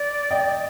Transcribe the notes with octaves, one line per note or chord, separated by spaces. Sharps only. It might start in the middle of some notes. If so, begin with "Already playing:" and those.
Already playing: D5
D#5 G5